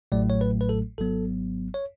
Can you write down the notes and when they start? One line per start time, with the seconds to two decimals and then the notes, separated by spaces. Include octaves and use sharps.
0.12 A1 A2 F#3 A3 D5
0.30 C#5
0.41 B4
0.61 B4
0.69 A4
0.98 G#1 G#2 F#3 B3 A4
1.74 C#5